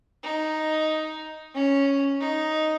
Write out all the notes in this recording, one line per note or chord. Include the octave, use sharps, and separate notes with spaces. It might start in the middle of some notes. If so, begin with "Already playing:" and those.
D#4
C#4
D#4